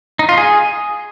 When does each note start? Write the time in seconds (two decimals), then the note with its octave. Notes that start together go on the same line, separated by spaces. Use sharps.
0.19 D#4
0.29 F4
0.38 G#4